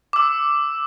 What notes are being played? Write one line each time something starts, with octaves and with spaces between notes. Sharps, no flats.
D6 E6